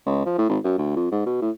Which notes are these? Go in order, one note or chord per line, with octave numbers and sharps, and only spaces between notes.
C#2
F3
A2
G#1
F#2
D2
F2
G#2
B2
A2